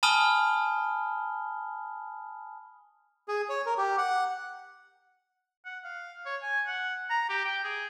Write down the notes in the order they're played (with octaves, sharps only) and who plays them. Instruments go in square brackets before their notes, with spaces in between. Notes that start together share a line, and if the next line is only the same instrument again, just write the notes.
[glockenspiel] G#5 A5 B5 D#6 F6 G7
[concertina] G#4
C#5
A#4
G4
F#5
[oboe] F#5
F5
C#5
G#5
F#5
A#5
G4
G5
G#4